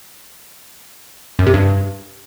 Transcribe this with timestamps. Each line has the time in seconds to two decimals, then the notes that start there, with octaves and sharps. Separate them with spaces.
1.39 F#2
1.46 C3
1.54 G2